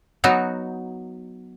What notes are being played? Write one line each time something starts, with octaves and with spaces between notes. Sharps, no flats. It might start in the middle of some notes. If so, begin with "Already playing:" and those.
F#3 B3 D#4 F#4